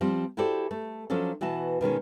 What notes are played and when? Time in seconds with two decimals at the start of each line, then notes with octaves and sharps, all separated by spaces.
0.01 F3 G3 C4
0.37 E4 F#4 G4 A4 C5 D5
0.71 A3
1.10 F3 F#3 C#4 D4 A4
1.41 B2 E3 B3 F#4 A5
1.81 B2 D#3 G#3 C#4